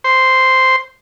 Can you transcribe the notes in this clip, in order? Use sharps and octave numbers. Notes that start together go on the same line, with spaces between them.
C5